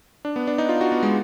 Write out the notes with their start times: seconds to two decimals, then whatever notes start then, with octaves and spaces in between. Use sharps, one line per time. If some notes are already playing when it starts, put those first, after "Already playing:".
0.25 D4
0.36 B3
0.47 D4
0.58 D#4
0.69 F4
0.81 F#4
0.92 B3
1.03 G#3